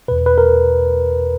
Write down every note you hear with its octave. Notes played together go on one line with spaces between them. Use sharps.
E2 B2 B4
B4
A#4